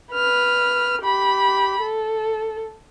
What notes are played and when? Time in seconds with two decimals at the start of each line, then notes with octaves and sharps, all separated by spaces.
0.13 B4 F6
1.03 G4 B5
1.81 A4